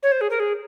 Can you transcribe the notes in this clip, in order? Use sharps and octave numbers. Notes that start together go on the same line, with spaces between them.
C#5
C5
G#4
A#4
G#4